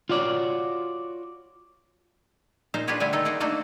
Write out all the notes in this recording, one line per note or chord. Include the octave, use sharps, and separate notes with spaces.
F4 F#4 C#5 D5
A#2 D#4 C5 F5
D4 F4 G4 G#4 B4 C#5
D3 G3 A3 F4 E5 G#5
D#3 D#4 F4 A4
D#4 G#4 D5 F#5
A3 A#3 D4 D#4 F#4